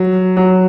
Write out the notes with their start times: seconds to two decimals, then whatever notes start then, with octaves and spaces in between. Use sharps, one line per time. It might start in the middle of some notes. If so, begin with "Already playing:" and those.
Already playing: F#3
0.37 F#3